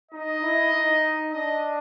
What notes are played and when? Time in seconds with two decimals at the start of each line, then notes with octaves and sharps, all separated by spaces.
0.12 D#4 D#5
0.42 E4
0.72 D#4
1.33 D4 D#5